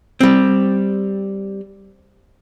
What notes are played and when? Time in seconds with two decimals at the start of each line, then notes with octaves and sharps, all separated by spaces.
0.21 G3 C4